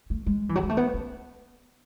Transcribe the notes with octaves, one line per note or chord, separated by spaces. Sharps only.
A3
G#3
E3
F#3
G#3
A3
B3
C#4